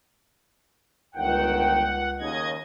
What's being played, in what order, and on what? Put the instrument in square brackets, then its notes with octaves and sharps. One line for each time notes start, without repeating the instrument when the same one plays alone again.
[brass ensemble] G1 D#3 G5 [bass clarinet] C#2 [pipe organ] F#5
[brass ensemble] D#2 C#3 [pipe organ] D#5 G#6